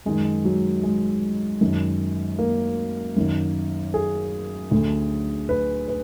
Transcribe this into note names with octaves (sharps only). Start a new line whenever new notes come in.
F#2 D#3 G#3
F#3
G#3
F#2 D#3
A#3
F#2 D#3
G#4
D2 D3
B4
B4